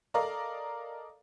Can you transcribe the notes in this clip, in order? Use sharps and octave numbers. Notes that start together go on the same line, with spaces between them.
A4 A#4 D5 D#5 F5 A#5